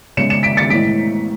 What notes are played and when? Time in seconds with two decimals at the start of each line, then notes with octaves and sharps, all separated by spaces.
0.17 C#3 G#3 C#7 E7
0.30 C#7 E7
0.43 B6 D7
0.57 A6 C#7
0.70 A2 E3 G#3 B6 D7